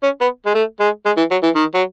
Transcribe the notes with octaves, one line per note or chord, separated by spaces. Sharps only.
C#4
B3
G#3
A3
G#3
G#3
E3
F#3
E3
D#3
F#3